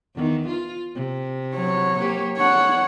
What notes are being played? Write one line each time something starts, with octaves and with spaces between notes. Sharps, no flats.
E2 D#3
F4
C3
F#3 C#5
A#3 G4
D4 C#5 F#5